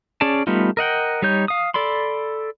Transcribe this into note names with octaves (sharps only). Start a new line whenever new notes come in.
C#4 G#4 D5 A5
G3 A3 B3 D#4 F4
A#4 D#5 F#5 G5
G3 D#4 C#5 G6
F5 D#6
A4 D5 B5 C6